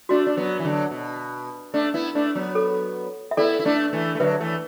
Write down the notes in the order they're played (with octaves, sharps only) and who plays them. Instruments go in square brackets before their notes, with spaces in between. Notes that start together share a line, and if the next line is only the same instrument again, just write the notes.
[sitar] A3 D4 [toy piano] F#4
[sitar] D4
F#3 B3
E3
D3 F#3
B2
A3 D4
B3 E4
A3 D4
F#3 B3
[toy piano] A4
E5
[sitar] B3 E4 [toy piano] A4 D5
[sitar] E4
A3 D4
E3 A3
A3
[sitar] D3 F#3 [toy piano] B4 E5
[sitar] E3 A3